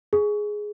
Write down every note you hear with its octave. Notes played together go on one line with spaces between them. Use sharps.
G#4